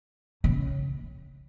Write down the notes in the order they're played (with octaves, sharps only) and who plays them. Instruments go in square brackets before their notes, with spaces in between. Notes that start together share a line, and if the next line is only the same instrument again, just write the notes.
[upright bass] C#3